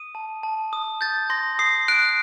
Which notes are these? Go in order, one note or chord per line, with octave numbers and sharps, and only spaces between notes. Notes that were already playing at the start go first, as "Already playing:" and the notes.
Already playing: D#6 D#7
A5
A5
D#6
G6 A6
C6 A#6
D#6 C7
F#6 D7